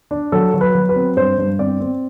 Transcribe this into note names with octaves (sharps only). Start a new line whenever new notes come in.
D4
F#3 A4
F#3
B4
F#3
B4
C4
G2 C5
G2
C4 D5
C4